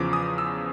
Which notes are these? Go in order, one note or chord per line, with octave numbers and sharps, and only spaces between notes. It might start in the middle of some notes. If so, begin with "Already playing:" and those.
Already playing: E2 C#3 F3 D6
D#6
E6